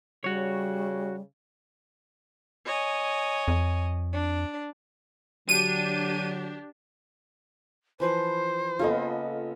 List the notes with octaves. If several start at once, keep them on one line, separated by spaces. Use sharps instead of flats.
C#3 G3 F#4 C#5
C#5 D#5 G#5
F2
D4
D3 F#3 D4 G4 D#7
E3 F3 B4 C5
C#3 A#3 B3 F4 A4 D#5